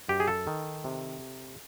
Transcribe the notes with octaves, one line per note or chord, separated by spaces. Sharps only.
F#2 G4
G#4
A4
D#3
C3